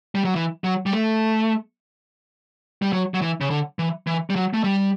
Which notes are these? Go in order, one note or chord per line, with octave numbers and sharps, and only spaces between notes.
G3
F#3
E3
F#3
G3
A3
G3
F#3
F#3
E3
C#3
D3
E3
E3
G3
F#3
A3
G3